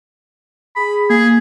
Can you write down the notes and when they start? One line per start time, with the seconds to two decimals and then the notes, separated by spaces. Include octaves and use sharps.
0.76 G#4 B5
1.10 A#3 G#4